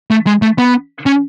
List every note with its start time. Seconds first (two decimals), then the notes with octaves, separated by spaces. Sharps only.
0.11 A3
0.27 G#3
0.42 A3
0.58 B3
1.06 C#4